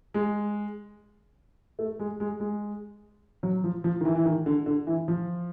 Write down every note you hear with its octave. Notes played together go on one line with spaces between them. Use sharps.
G#3
A3
G#3
G#3
G#3
F#3
F3
F3
D#3
E3
E3
D#3
D3
D3
E3
F3